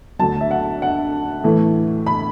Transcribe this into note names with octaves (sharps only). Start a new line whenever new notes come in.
D2 D3 F#3 A5
E5
F#5
F#5
A2 E3 A3
B5